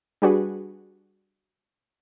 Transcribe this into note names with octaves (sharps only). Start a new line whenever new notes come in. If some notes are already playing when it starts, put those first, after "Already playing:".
G3 D4 F#4 G#4 B4